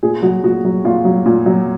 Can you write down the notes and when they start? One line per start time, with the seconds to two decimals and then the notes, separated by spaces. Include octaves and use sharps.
0.03 A#2 G#4
0.22 F#3 F#4
0.44 A#2 F#4
0.65 F#3
0.84 A#2 F4
1.05 F#3
1.26 A#2
1.46 F#3